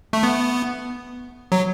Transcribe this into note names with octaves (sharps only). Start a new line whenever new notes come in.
A3
B3
F#3